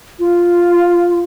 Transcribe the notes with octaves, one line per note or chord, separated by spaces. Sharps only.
F4